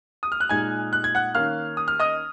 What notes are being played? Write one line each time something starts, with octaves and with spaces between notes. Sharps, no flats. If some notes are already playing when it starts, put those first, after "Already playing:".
D#6
F6
F#6
A#2 G#3 D#4 G#5 G#6
F#6
G#6
F#5 F#6
D#3 A#3 C#4 F5 F6
D#6
F6
D#5 D#6